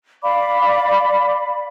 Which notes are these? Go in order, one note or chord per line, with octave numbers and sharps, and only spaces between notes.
D5 F5 B5 D6